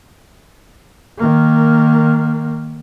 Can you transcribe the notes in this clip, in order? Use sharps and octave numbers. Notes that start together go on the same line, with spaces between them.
D#3 A#3